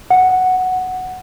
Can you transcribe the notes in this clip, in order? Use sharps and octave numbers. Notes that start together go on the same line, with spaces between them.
F#5